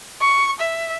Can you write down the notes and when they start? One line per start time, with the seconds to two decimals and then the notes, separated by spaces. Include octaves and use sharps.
0.21 C#6
0.60 E5